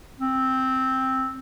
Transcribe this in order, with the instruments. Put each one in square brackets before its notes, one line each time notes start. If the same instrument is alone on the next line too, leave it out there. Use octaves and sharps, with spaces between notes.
[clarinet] C4